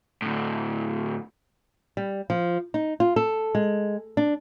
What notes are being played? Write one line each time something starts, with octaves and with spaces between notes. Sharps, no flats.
A2 D3
G3
F3
D#4
F4
A4
G#3
D4